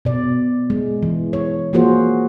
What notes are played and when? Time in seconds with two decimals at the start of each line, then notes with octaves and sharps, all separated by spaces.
0.05 B2 D5
0.70 G#3
1.03 E3
1.33 C#5
1.73 F3 A#3 F4 F#4 G#4 C5